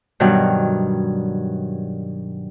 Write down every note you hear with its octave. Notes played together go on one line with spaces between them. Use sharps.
G2 B2 D#3 F#3 G3